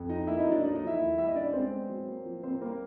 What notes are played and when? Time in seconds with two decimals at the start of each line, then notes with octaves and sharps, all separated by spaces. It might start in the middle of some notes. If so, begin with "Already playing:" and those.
Already playing: F2
0.09 F3 D#4 D#5
0.27 A#3 E4 E5
0.40 D#4 D#5
0.46 F#3
0.51 D4 D5
0.63 A3 D#4 D#5
0.75 D#4 D#5
0.81 F3
0.87 E4 E5
1.00 D#2
1.18 G3 E5
1.27 D#5
1.35 C#4 D4 D5
1.53 G#3 C4 C5
1.71 B3
1.89 F#3
2.08 A#3
2.25 F3
2.43 A#3 C4 C5
2.61 G3 A#3 A#4